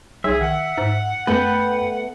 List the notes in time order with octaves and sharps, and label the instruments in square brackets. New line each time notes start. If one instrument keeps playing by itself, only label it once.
[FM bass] B1 [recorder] G#4 [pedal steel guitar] E5
[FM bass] D#3 [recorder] F#5
[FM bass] G#2
[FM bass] F#2 [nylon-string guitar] A3 B3 A4 [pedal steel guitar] B4 G5